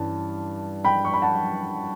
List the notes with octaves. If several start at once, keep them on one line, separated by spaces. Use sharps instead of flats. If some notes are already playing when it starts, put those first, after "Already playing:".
Already playing: G2 E3 G3 C#4 A5
G5 B5
C#6
B5
F#5 A5